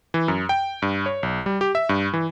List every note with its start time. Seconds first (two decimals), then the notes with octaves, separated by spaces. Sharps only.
0.14 E3
0.28 F#2
0.49 G5
0.82 G2
1.06 C#5
1.23 B1
1.46 G3
1.61 G4
1.75 E5
1.89 G2
2.13 E3